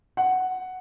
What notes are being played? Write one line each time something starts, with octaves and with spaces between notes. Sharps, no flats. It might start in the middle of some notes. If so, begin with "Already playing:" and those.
F#5